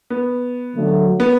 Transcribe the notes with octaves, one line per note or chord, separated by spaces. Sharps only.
B3
D3 F#3 A3
B3